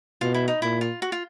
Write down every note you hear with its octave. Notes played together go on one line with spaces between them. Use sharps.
B2 F4
E4
D#4
A#2 E4
F4
F#4
F4